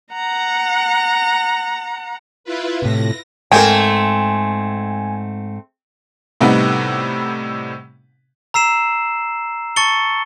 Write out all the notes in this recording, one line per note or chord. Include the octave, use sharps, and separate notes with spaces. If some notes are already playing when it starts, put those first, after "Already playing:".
F#5 A#5
E4 F4 B4
A2 C3 A#6
G#2 A3 C4 A#4 G5 G#5
A2 C3 G3 B3 D#4 F#5
A#5 E6 C7 E7
A5 C#6 A6 C#7 G7